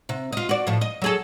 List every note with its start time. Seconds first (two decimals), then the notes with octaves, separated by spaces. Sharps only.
0.09 C3
0.32 F4 D#5
0.49 F#4 D5
0.67 A2 F3
0.81 D#5
1.02 F#3 G#4 A4